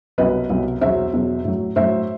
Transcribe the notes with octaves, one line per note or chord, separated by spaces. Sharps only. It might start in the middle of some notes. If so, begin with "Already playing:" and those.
C2 B2 F#3 B4 D#5
C2 B2 F#3
E2 B2 F#3 C5 E5
E2 B2 F#3
A2 F#3
A2 F#3 C5 E5